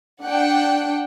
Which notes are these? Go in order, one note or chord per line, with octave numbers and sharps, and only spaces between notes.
D4 F#5 G5